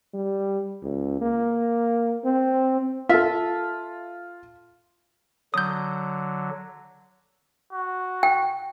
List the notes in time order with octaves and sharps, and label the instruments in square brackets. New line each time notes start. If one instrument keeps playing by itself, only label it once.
[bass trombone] G3
C#2
A#3
C4
[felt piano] F4 [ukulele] A4 E5
[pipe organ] D3 F#3 [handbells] D#6 G6
[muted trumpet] F#4
[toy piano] G5